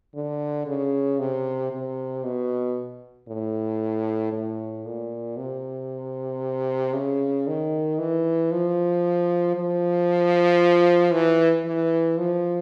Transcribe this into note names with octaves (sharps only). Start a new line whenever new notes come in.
D3
C#3
C3
C3
B2
A2
A2
A#2
C3
C#3
D#3
E3
F3
F3
E3
E3
F3